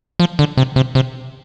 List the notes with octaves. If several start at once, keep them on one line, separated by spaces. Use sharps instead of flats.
F3
D3
C3
C3
C3